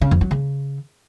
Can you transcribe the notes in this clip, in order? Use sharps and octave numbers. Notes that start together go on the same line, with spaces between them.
C#3
F2
F#3
C#3